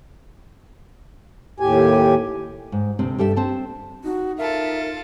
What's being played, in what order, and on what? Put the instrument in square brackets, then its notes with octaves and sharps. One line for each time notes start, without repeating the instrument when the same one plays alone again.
[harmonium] D#2 A2 G4 G#5
[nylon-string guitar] G#2
D2 C3 C4
G2 G4 A4 E5
C4 A5
[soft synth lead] D#4 [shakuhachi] F#4
[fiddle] F4 A4 [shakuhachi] A#4 [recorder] E5